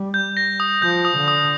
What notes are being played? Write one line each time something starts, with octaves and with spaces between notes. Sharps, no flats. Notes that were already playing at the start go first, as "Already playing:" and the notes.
Already playing: G3
G6
A#6
D#6
F3 G6
D#6
D3
D#6